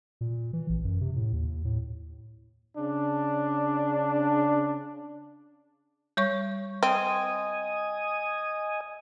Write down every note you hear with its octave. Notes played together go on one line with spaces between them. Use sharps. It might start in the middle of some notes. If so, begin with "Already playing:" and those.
A#2
E3
A1
F#2
C3
A2
D#2
A2
C#3 D4
G3 C#5 C#6
C4 D#5 G#5 D#6